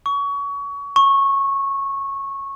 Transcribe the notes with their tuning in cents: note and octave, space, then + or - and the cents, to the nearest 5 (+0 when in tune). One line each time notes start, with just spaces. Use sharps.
C#6 +25
C#6 -15